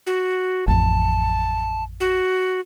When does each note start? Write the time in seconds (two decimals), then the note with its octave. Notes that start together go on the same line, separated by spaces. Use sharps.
0.07 F#4
0.68 A1 F2 A5
2.00 F#4